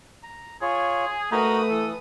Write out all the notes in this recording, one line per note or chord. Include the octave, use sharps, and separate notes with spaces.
A#5
F4 G#4 C#5
A3 D#4 F#4 A#4 B4 B5 D#6
E3 A4